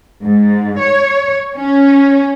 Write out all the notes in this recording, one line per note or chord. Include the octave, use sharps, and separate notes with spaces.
G#2
C#5
C#4